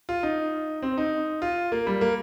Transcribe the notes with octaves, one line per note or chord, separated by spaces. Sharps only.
F4
D#4
C4
D#4
F4
A#3
G3
A#3